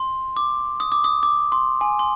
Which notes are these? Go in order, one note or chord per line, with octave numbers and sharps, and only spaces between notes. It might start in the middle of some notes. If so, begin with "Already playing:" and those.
Already playing: C6
D6
D#6
D6
D#6
D6
C6
G#5
C6